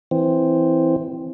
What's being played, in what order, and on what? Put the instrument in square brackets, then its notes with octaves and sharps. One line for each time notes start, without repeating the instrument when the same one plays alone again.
[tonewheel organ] E3 C4